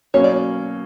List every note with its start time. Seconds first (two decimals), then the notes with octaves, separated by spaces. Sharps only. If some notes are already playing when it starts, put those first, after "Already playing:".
0.14 B2 F#3 A#3 C#4 C#5
0.24 D5